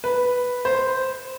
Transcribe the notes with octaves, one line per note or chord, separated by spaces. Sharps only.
B4
C5